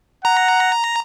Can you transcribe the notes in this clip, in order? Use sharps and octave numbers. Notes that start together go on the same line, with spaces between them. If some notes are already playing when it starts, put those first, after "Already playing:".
F#5 A#5